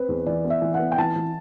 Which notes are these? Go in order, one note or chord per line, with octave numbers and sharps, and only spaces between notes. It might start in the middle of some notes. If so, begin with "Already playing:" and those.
Already playing: C4 B4
E2
E3 D5
B3
E5
E3
F#5
B3
G5
E3 A5
E3